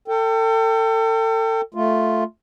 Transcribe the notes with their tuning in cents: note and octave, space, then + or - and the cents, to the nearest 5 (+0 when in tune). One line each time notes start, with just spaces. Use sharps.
A4 +35 G5 +0
A3 +0 F4 +0